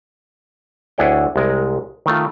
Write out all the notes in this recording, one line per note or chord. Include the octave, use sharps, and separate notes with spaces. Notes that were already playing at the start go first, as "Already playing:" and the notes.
D2 D4 E4 G#4 C#5 G5
C2 G#3 A#4
D#3 A3 F4